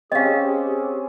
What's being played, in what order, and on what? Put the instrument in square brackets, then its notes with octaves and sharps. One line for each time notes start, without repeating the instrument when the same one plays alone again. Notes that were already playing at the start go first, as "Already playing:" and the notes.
[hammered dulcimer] C4 C#4 [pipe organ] G4 G#4 [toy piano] D#5 F5